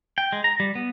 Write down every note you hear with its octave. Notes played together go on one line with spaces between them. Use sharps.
G5
G#3
A#5
G3
B3